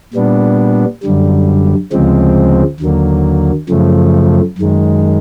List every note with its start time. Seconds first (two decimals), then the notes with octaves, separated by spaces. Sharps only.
0.14 A#2 G3 B3 D4
1.03 F#2 D3 G3
1.92 D2 C#3 F3 G#3 C4
2.80 D#2 D3 F#3 A#3
3.69 F#2 C#3 F3 A3
4.58 F#2 D#3 G#3